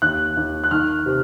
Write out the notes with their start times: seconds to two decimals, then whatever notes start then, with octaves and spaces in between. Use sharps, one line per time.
0.02 D#2 F#6
0.37 D#2
0.64 F#6
0.71 D#3 F6
1.06 C3